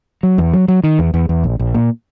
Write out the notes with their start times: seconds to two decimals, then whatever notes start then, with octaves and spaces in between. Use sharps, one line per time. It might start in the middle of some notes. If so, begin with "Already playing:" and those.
0.23 F#3
0.38 E2
0.53 F#3
0.68 F#3
0.84 D#3
0.99 E2
1.14 E2
1.29 E2
1.44 A#1
1.59 A#1
1.74 A#2